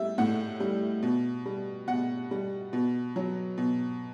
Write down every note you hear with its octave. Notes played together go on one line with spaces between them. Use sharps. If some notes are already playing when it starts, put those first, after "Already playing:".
Already playing: A2 G3 E5
A2 F#5
G3
B2
G3
B2 F#5
G3
B2
F#3
B2